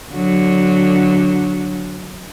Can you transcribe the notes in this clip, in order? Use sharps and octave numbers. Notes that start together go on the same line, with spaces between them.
D3 F#3